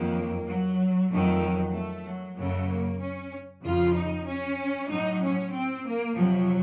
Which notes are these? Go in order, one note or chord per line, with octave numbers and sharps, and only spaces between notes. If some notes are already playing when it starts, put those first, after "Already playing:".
Already playing: F2 D#3 F#3 A#3
F#3
F2 D#3 F#3 A3
F#3
A3
F#3
F#2 C#3 F#3 A3
A#3
C#4
F2 C#3 F3 F4
D#4
C#4
A2 F#3 D#4
C#4
C4
A#3
F2 C3 F3 F#3